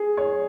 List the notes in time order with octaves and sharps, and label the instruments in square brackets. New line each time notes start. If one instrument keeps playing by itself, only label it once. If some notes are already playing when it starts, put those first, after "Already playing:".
Already playing: [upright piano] G#4
C#5